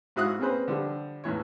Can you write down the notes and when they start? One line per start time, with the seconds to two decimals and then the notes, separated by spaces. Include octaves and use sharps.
0.16 G#2 E4 F#4 F5 D#6 F#6
0.39 A#3 C4 C#4 G#4 B4 C5
0.68 D3 F3 G3
1.24 A1 E2 A2 E3 C#5